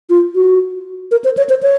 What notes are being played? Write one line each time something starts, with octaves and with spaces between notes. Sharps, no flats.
F4
F#4
A#4
C5
C#5
C5
C#5